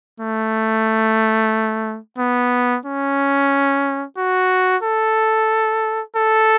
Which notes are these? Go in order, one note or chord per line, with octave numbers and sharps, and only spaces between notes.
A3
B3
C#4
F#4
A4
A4